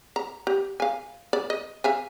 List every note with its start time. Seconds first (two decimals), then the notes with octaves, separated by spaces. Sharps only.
0.16 A#5
0.47 G4
0.80 F5 G#5
1.33 D5
1.50 D#5
1.84 E5 F5 G#5